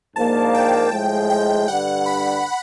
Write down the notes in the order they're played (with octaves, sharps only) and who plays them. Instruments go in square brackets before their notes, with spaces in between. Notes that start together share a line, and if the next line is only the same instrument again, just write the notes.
[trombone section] G#2 F3 A#3 D4 [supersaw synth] A5
[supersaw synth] G5
[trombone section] A2 F3 G#3
[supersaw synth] G5
[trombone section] G2 D3 G3 [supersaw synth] F#5
[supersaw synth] B5